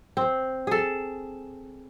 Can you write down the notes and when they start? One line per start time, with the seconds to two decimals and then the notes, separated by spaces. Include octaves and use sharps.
0.17 C4
0.67 G#4 A4